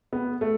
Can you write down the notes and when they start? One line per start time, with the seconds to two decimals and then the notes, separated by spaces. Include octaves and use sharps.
0.13 B3
0.41 A3